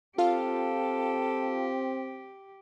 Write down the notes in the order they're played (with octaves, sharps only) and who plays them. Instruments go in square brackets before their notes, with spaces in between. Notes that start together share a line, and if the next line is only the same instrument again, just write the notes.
[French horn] C4 [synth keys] F4 F5 [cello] G4 [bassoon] A4